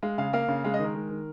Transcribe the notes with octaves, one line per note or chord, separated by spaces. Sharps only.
G#3 F5
C#3 F5
A#3 F5
C#3
G#3 F5
D#5
D#3
A#4
G#3
D#3